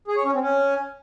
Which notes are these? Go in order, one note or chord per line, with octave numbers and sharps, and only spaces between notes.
G#4
C#5
C#4
C4
C#4